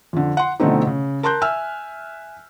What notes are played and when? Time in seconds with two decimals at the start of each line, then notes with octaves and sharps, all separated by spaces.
0.13 F2 D3
0.37 F#5 C6
0.60 B2 D3 F3 A3 C4 D#4
0.87 C#3
1.23 A#4 A5 C6 F#6 G6
1.41 E5 G#5 E6 F6